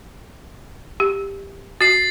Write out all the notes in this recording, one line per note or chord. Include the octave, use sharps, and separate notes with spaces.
G4
F#4 A6 C7